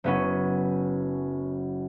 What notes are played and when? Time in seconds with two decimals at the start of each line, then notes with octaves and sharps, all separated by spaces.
0.04 F#1 B3 C#4